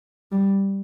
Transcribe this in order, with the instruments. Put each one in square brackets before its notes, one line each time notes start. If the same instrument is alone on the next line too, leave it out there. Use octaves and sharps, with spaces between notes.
[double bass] G3